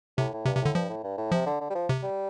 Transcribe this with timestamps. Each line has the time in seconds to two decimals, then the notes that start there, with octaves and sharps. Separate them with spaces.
0.18 A2 C3
0.33 A2
0.46 G2 C3
0.57 C3
0.62 A2 D3
0.75 G2 F3
0.89 A2
1.04 G2
1.18 A2
1.32 C3 F3
1.46 D3
1.60 D3
1.70 G3
1.75 F3
1.89 C3
2.03 G3